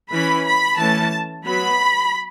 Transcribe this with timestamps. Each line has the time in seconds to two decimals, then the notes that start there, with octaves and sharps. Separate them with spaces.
0.13 E3 C#4 B5
0.46 B5
0.78 E3 A3 C#4 A5
1.44 F#3 B3 B5